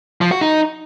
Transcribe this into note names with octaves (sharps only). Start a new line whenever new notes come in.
F3
F#4
D#4